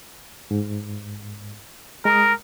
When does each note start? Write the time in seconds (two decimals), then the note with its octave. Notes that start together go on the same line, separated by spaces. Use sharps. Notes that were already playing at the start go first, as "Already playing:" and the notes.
0.51 G#2
2.05 G#3 A#4 A#5 D#6